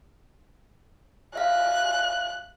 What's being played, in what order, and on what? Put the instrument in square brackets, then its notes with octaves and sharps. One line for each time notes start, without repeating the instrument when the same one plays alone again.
[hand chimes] E5 F5 [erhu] F#6